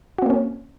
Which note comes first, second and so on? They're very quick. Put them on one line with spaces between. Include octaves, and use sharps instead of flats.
F#4 C4 A#3 C#4